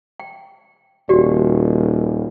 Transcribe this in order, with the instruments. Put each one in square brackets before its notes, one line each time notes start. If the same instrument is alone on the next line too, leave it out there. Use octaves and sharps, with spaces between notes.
[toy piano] G5
[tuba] D#1 [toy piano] F#4 G4 D5